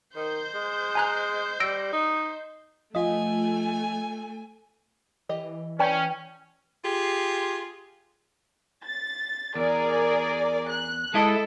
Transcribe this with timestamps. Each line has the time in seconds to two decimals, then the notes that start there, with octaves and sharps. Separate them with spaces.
0.16 D#3 C5 G6
0.54 G#3
0.95 G#5 A#5 F#6
1.60 G3 E6 A#6 D7
1.93 D#4
2.95 F3 A3 F4 D#5 G#5
5.29 E3 G4 D#5
5.79 C#4 B4 D5 G5
6.84 F4 G4 G#4
8.85 A6
9.55 E2 G#4 A#4 D5
10.69 F#6
11.14 G#3 E4 A4 D#5